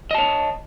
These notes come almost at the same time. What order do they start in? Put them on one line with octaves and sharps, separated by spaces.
D#5 A5 C#5